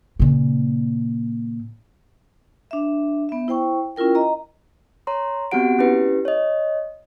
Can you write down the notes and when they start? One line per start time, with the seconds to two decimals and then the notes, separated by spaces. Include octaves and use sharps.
0.20 A#2 C#3
2.71 D4 E5
3.29 B3 E5
3.48 E4 C5 G5 C#6
3.96 C#4 E4 F4 A#4 G5
4.15 D#5 A#5
5.07 C#5 A#5 C6
5.51 B3 C4 F#4 G4 F#5 D7
5.79 C#4 E4 G4 B4
6.25 C#5 D#5